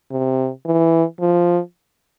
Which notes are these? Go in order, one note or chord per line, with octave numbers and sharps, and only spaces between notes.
C3
E3
F3